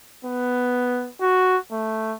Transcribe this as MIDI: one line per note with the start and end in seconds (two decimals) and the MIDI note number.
0.25 1.08 59
1.21 1.57 66
1.72 2.15 57